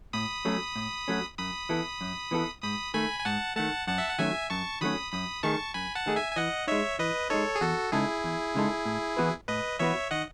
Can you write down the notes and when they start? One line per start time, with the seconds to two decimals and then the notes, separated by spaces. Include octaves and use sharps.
0.13 A2 B5 D#6
0.45 F#3 A3 C#4
0.76 A2
1.08 F#3 A3 C#4
1.38 F#2 B5 D#6
1.69 E3 B3 E4 A4
2.01 F#2
2.31 E3 B3 E4 A4
2.62 G#2 B5 D#6
2.94 D#3 A3 G#5 B5
3.20 G#5
3.25 G#2 F#5 A5
3.56 D#3 A3 F#5 A5
3.87 F#2 F#5 A5
3.98 E5
4.09 F#5
4.19 D#3 F#3 A3 C#4 E5 G#5
4.50 F#2 A5 C#6
4.81 D#3 F#3 A3 C#4 B5 D#6
5.12 F#2 B5 D#6
5.43 D#3 A3 D#4 G#4 A5 C#6
5.74 F#2 G#5 B5
5.95 F#5 A5
6.06 D#3 A3 D#4 G#4
6.16 E5 G#5
6.32 G#5
6.36 E3 D#5 F#5
6.67 G#3 D#4 C#5 E5
6.99 E3 B4 D#5
7.30 G#3 D#4 A4 C#5
7.56 G#4
7.61 E2 F#4 A4
7.92 C#3 G#3 D#4 E4 G#4 A4
8.24 E2
8.55 C#3 G#3 D#4 A4
8.86 A2
9.17 E3 B3 F#4 B4
9.48 A2 B4 D#5
9.79 E3 B3 F#4 B4 C#5 E5
10.11 D#3 D#5 F#5